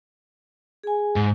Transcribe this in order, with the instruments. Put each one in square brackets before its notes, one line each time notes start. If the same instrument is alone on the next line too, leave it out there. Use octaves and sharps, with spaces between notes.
[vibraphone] G#4 G#5
[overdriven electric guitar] G#2